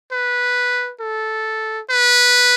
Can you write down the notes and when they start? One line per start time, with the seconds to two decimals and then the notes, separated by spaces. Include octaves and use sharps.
0.12 B4
1.01 A4
1.90 B4